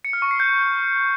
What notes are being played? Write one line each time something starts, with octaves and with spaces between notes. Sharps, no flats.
C#7
F6
C#6
C7
G6